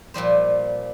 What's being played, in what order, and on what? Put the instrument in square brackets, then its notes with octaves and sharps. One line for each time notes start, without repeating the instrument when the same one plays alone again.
[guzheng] A#2 F3 G3 C5